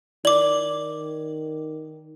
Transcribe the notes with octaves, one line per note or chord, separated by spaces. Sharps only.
D#3 D5 D6 F#7